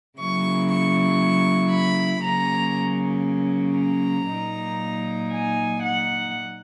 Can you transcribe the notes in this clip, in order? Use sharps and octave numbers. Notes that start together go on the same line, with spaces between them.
C#3 F#3 A#3 E4 C#6
C#6
B5
C#3 F#3 A#3 C#4 A#5
A#5
A#2 F#3 A#3 D#4
G#5
F#5